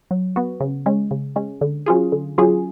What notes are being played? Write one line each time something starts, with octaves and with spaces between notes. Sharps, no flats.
F#3
B3 F#4
C#3
G#3 C#4
C#3
G#3 C#4
D3
F#3 C#4 F4 G#4
D3
F#3 C#4 F4 G#4